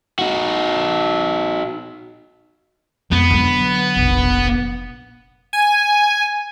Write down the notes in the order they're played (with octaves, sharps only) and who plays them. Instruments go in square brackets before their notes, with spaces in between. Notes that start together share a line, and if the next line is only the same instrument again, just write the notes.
[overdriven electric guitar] D#4 F#4
[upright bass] F2 [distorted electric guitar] B3
[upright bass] D3 F#3
F1 A#1
[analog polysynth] G#5